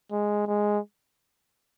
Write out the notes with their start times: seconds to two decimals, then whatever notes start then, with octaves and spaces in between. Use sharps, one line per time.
0.11 G#3
0.47 G#3